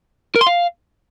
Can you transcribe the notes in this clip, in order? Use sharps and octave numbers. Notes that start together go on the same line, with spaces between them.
A#4
C6
F5